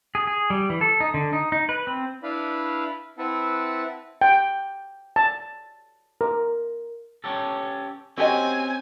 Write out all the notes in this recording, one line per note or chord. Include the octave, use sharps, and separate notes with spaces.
G#4
G#4
G3
E3
A4
D#4
D3
D#4
D#4
B4
C4
D4 E4 B4 D5 F5 B5
C4 E4 B4 E5 F#5 A5
G5
A5
A#4
C#4 G4 A4
C4 C#4 F#4 G4 C5 D#5 G#5